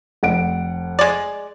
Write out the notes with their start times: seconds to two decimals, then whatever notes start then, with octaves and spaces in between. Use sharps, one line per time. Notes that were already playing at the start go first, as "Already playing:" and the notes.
0.23 F1 F#5 D7
0.99 G#3 D5